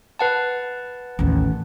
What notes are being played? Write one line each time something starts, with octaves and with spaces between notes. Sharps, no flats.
B4 F#5 A5
A1 D#2